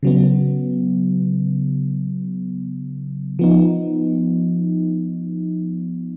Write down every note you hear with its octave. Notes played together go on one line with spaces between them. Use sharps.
C#3 F#3 B3
F3 B3 D#4